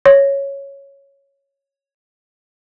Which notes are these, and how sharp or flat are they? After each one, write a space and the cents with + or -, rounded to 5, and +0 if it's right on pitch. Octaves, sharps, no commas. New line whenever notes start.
C#5 -5